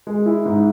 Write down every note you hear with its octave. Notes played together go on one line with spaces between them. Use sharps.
G#3
E4
G#2